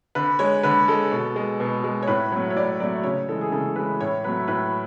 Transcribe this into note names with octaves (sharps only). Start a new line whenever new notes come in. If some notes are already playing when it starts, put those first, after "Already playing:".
D3 B4
G#3 C#5
D3 B4
G#3 A4
B2
G#3
B2
G#3
C#5
A2 B4
F#3 A3 C#5
C#5
A2 D5
F#3 A3 D5
C#3 C#5
E3 G#3 A4
G#4
C#3 A4
E3 G#3 B4
A2 C#5
F#3 A3 B4
A2 B4